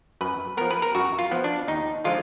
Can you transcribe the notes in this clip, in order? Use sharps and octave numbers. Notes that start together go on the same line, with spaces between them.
F#2 B4
F3 B3 A#4
B4
A#4
F#2 F#4
F4
F3 B3
D4
D#2 D#4
D3 F3 G#3 F4